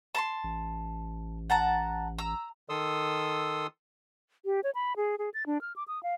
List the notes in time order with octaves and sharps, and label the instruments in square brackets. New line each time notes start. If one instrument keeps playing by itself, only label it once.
[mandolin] A5 A#5 C6
[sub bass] A1
[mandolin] F#5 A5 A#5
A#5 E6
[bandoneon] D#3 A4 C6 D#6 E6
[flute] G4
C#5
B5
G#4
G#4
A6
D4
F6
D6
D#6
F5